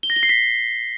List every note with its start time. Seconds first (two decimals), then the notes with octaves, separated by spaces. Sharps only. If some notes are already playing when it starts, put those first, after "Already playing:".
0.03 G7
0.10 A#6
0.16 G7
0.23 C7
0.29 B6